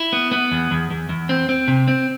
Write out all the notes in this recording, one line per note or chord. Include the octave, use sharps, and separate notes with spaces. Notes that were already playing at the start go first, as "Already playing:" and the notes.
Already playing: E4
B3
B3
E2
E2
E2
E2
C4
C4
C3
C4